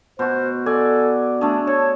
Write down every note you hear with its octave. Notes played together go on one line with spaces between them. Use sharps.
B2 F#4 C5
A4 D5 G#5
A3 D4 G#4
A4 C#5